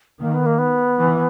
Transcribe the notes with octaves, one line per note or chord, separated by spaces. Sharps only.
D#3 A#3
B3
A#3
B3
E3